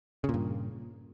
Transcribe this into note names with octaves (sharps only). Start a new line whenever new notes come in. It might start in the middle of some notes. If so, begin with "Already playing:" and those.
G2 A#2 C#3